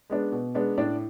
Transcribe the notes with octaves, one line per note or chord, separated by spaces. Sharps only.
G#3 B3 D4
B2
G#3 B3 D4
A2 D4 D5